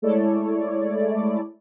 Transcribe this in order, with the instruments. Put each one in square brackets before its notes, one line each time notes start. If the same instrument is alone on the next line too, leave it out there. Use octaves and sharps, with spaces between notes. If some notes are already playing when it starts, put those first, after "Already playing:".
[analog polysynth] G#3 A3 E4 A4 C#5 D5